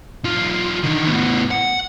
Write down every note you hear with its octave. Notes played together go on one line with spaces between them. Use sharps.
B1 F4
D3 D#3
A2 B3
F#5